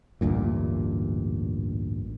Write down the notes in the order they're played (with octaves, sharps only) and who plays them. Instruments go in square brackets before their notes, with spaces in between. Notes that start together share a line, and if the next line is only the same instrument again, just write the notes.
[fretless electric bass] A1 D2 G2 A#2